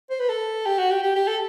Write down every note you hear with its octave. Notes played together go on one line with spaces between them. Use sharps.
C5
B4
A4
G4
F#4
G4
G4
G4
A4